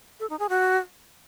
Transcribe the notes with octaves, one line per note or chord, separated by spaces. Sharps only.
A4
D#4
G#4
F#4